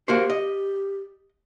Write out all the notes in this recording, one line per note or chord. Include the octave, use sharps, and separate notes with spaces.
A#3 F#4 G4 C5
D#5